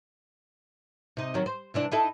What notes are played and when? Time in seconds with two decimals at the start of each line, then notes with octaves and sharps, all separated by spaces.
1.17 C3 D#4
1.34 D#3 F#3
1.46 C5
1.74 C3 E3 D4
1.92 D#4 E4 A4